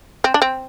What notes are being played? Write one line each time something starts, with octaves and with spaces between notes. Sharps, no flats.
C4
D4
C4